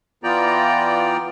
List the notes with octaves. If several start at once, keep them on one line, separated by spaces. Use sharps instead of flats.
E3 B3 F4 D5 G5 A#5